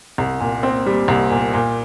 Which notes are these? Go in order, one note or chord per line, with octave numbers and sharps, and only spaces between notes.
C2
A#2
C4
G3
C2
A#2
A#2